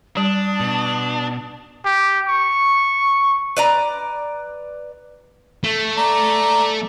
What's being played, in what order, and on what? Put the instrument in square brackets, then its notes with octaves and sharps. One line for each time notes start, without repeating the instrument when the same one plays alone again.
[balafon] G3 [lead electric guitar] D4 [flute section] A5 D#6
[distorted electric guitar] B2
[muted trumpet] G4
C#6
[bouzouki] B4 D5 A#5
[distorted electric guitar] A3
[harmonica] D5 A#5